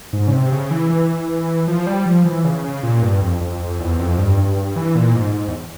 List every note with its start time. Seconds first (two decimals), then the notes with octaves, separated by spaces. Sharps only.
0.13 G#2
0.28 C#3
0.32 C3
0.52 C#3
0.71 E3
0.90 E3
1.68 F3
1.87 G3
2.06 F3
2.25 E3
2.45 C#3
2.64 C#3
2.83 A#2
3.02 G2
3.22 F2
3.41 F2
3.60 F2
3.80 E2
3.99 F2
4.18 G2
4.37 G2
4.57 G2
4.76 E3
4.95 A#2
5.15 G#2
5.34 G#2
5.48 E2